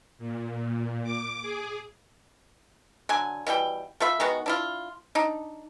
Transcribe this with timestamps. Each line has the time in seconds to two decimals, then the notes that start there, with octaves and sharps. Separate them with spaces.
0.18 A#2
0.54 A#2
1.03 D6
1.42 G#4
3.09 D3 F#3 G#5
3.47 B2 E3 G3 G5
4.00 A3 F4 E5 B5
4.20 D#3 G#3 B3 F#4
4.46 D4 E4 F4
5.15 D4 D#4